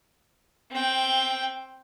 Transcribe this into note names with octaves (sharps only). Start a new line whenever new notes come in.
C4 G5